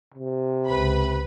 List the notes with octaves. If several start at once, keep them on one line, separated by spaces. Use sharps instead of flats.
C3
C#2 B4 B5